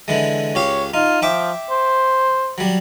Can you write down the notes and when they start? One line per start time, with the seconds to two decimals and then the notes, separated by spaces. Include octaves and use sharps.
0.08 D3 E3 G#3
0.55 C#2 G4 C#5 F5
0.94 D#4 F4
1.22 F3 E5 G5 D6
1.70 C5
2.58 F#3 G3